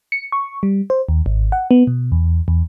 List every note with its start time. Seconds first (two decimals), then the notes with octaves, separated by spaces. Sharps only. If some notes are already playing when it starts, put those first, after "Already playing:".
0.12 C#7
0.32 C#6
0.63 G3
0.90 C5
1.09 D#2
1.26 G#1
1.52 F#5
1.71 B3
1.87 B2
2.12 E2
2.48 E2